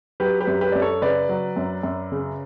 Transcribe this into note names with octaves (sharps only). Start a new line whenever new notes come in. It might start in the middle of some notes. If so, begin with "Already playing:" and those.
F#3 G4 B4
G4 B4
F#2
G4 B4
F#2 D5
A4 C#5
C#3 B4 D5
F#3
F#2
F#2
C#3